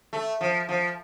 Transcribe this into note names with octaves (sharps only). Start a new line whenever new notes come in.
A3
F3
F3